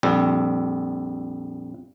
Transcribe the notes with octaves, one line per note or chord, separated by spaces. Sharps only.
A#1 F2 G3